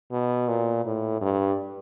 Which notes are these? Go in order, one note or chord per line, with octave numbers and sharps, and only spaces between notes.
B2
A#2
A2
G2